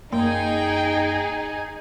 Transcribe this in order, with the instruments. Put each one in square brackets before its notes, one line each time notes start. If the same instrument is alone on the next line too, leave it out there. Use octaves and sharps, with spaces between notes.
[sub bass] F#2 [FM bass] A#3 [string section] D#4 G#4 [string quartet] G5